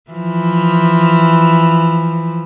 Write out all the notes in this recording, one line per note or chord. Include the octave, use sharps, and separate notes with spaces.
E3 F3